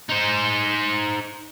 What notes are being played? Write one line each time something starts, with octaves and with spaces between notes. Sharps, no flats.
D#4 C5